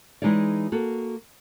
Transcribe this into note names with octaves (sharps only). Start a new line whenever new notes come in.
E3 G#3 D#4 G#4 C#5 D5
A#3 F#4 A4